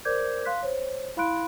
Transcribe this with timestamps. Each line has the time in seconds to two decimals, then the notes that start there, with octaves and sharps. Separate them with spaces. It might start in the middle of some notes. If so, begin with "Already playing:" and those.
0.05 A#4 C5 D5 D6 G6 G#6
0.45 F5 C6 F#6 B6
0.63 C5 C#5
1.17 E4 F5 B5 C6 F#6 D7